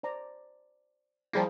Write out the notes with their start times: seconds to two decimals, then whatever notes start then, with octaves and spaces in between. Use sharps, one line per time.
0.03 C5 D5 A#5
1.33 F3 G3 A#3 E4 G#4 C5